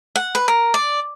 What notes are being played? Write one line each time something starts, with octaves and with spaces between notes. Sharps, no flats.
F#5
B4
A#4
D5